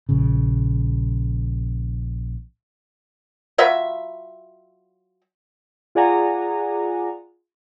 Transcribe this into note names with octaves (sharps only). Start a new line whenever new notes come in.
A#1 C#3
F#3 F4 E5 B5
F4 G#4 D5 F#5 G#5 A#5